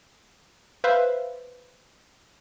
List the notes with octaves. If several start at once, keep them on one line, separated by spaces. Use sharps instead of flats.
B4 C5 E5 F5